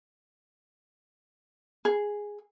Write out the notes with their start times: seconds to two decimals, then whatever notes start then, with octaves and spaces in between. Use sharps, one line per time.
1.85 G#4